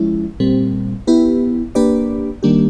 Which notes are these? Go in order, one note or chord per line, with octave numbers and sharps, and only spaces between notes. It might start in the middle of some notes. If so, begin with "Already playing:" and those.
Already playing: F3 G#3 C#4 E4
A#2 G3 C4
B3 E4 G4 B4
A#3 D4 G4 B4 D5
D#3 G3 A#3 D4 G4